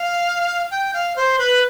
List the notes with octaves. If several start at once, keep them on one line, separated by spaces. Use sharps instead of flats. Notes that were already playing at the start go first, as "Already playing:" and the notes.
Already playing: F5
G5
F5
C5
B4